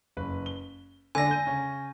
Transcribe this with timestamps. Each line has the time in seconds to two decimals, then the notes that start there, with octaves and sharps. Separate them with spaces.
0.17 F#1 B4
0.46 G7
1.15 D3 D4 G#5 A#6
1.31 G6 D#7
1.47 C#3 C#4